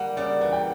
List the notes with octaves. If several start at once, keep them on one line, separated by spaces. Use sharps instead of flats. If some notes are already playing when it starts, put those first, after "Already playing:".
Already playing: G3 A#3 F#5
C#3 D5
E3 F#5
G5